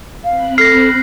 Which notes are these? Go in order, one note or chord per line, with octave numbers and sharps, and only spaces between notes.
C4 F5 B5 F#6
A4 F6 A#6 C7